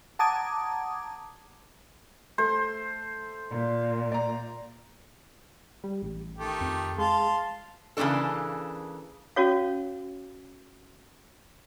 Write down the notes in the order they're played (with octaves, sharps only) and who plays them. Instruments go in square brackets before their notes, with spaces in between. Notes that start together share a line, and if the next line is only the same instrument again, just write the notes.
[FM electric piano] F#5 A5 A#5 D6 D#6 G#6
[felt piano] A3 [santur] C5
[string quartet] A#2
[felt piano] D5 A#5
[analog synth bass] G3
A1
[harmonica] D#3 A3 G4
[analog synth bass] F2
[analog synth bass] G#3 [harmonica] F5 A5 C6
[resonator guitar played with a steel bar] C#3 E3 G#3 A#3 D4 A4
[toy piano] C#4 F#4 C#5 F5